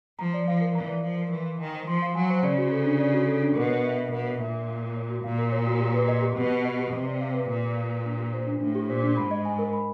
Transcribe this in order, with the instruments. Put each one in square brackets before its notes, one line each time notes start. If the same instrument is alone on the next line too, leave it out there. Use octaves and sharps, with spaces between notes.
[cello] F3 [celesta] A#5
[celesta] D5
[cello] F3 [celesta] F5
[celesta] A#4
[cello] E3 [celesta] A#5
[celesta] D5
[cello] F3 [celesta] F5
[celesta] A#4
[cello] E3 [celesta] C6
[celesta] F5
[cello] D#3 [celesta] G#5
[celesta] C5
[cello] F3 [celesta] C6
[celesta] F5
[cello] F#3 [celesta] G#5
[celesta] C5
[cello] C#3 [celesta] D5
[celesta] F#4
A4
D4
D5
F#4
A4
D4
[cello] B2 [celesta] A#4
[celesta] C#5
E5
A#4
[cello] B2 [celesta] A#4
[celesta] C#5
[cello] A#2 [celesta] E5
[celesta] A#4
F5
A#4
C#5
F#4
[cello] A#2 [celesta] F5
[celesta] A#4
C#5
F#4
G4
B4
D#5
G4
[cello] B2 [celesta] G4
[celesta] B4
D#5
G4
[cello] C3 [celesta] B4
[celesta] D5
F5
B4
[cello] A#2 [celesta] B4
[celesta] D5
F5
B4
D4
G4
C5
D4
[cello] A2 [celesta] D4
[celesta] G4
[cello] A#2 [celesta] C5
[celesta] D4
[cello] G#2 [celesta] B5
[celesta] D#5
G#5
A#4
B5